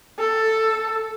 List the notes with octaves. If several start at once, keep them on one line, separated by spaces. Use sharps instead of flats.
A4